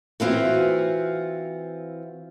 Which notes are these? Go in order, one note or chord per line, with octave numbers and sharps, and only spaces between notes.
E3 C4 F4 F#4